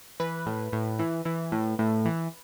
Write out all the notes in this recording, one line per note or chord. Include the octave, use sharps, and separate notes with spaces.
E3 B4
A2
A2
E3
E3
A2
A2
E3